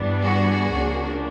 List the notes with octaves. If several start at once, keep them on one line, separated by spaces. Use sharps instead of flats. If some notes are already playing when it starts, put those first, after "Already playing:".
Already playing: G2 E3 G3 B3 D4
F#4 G#4
C#2 C#3 F3 A#3 D4